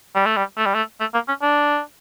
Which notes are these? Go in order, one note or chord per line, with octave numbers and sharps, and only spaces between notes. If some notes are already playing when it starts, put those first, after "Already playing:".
G3
A3
G3
A3
G3
A3
A3
A#3
C#4
D4